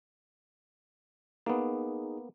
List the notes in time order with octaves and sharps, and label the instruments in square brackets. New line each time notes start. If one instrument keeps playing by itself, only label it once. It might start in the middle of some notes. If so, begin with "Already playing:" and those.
[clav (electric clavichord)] A#3 B3 [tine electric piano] D#4 G#4